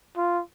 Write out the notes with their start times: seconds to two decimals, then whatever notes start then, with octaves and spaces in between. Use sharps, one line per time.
0.17 F4